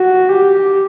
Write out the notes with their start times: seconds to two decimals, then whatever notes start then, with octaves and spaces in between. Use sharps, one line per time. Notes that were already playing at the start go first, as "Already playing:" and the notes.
Already playing: F#4
0.29 G4